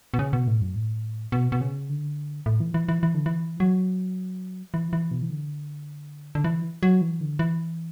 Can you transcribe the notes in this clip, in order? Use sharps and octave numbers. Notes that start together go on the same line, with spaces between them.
B2
C#3
B2
A2
F#2
A2
B2
B2
C#3
D3
A2
E3
E3
E3
E3
D3
E3
F#3
E3
E3
B2
E3
D3
D3
E3
F#3
E3
D3
E3